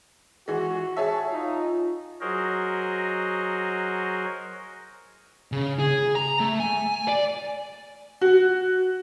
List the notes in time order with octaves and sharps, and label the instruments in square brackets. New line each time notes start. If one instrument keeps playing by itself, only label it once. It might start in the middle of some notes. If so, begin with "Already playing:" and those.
[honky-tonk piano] E3 G#3 [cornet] F#4
[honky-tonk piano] G#4 C#5 E5 [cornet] A5
[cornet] D#4 [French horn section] F4
[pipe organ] F#3 F#4 G#4 A#4 C5 D#5
[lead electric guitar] C#3
G#4
A#5
A3
G#5
D5
[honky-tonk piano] F#4